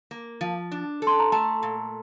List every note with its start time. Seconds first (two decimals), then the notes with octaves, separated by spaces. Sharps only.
0.11 A#3
0.41 F3
0.72 D4
1.02 A4
1.07 C6
1.20 A#5
1.32 A3 A5
1.63 A#2